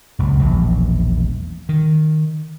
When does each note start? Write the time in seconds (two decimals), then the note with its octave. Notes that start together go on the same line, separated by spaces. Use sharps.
0.19 F#1 C#2
0.40 E1 A#1 F#3
1.69 D#3